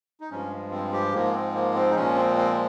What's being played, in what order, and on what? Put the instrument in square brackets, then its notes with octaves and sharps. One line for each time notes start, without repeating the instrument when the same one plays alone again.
[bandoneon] D#4
G2 F3 G#3 C#4
C4
G4
G#2 F3 G#3 A#3
C4
A#3
C4
D#4
A#2 F3 G#3 C#4
C4
C4